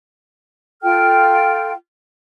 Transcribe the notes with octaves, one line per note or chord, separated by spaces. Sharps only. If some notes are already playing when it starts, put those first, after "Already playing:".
F4 A4 G5 F6